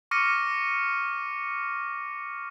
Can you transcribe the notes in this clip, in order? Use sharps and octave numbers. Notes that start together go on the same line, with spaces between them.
C#6 D6 F6 A#6 C#7 D#7